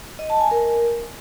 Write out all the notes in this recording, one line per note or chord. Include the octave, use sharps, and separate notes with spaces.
D#5
A5
G#5
A#4